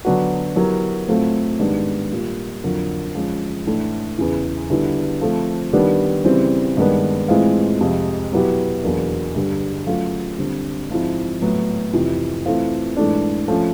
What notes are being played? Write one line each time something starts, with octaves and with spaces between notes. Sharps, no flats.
D3 F#3 B3 D4 F#4
F#3 B3 E4 G4 A#4
A2 F#3 A3 C4 F4
G#2 D#3 G3 B3 D4
A#2 G3 A#3
F2 D3 F#3 A#3
F3 G#3 C#4
A2 E3 A3 D4
E2 C#3 E3
D3 G3 B3 E4
F3 A3 C4
D#3 G3 B3 D4
C#3 E3 G3 C4
G2 D#3 G#3 B3 D4
A2 E3 G#3 C4 F4
F2 C3 F3 G#3
B2 F#3 B3 E4 G4
E2 B2 F#3 A#3 D4
G2 D3 G3
F#3 A3 C#4 F4
D3 G3 C4
G#2 F3 G#3 C4 E4
A2 F#3 B3
F2 C3 E3
E3 A3 C4 F4
G#2 E3 A3 D4
F3 A3 C#4